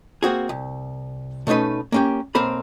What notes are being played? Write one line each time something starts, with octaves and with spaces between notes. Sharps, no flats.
A#3 C4 F#4 G#4
C2
B2 A3 C#4 D#4 B4
A#3 C#4 G4
B1 A#3 C4 A#4 C5 B5